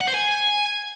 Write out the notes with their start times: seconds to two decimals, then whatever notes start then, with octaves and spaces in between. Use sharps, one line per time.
0.01 F#5
0.07 C5
0.14 G#5